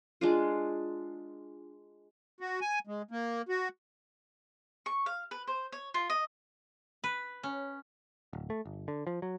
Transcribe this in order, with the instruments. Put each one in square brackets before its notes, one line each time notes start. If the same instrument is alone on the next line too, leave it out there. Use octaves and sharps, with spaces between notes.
[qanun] G#3 D4 F4
[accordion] F#4
G#5
G#3
A#3
F#4
[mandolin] C#6
F5
B4
C5
C#5
F4
D#5
[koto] B4
C#4
[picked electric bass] D1
A3
G1
D3
F3
F#3